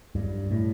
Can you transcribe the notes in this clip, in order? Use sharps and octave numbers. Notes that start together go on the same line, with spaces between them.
G2
A2